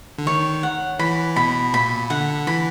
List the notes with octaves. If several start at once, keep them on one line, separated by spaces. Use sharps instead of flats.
D3
D#3 C#5
F#5
E3 B5
B2 B5
A#2 B5
D3 F#5
E3 B5